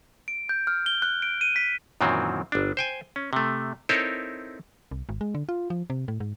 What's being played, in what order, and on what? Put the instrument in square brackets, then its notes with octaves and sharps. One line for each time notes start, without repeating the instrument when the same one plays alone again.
[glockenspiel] D7
G6
F6
G7
F#6
D7
D#7
B6
[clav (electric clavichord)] F#2 A#2 D#3 E3 F#3 C4
G1 D4
C5 G5 G#5
C#4
C3 A3
C4 D#4 E4 A4 A#4 C#5
[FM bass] C2
G#1
G#3
D3
F4
F3
C3
A2
G#2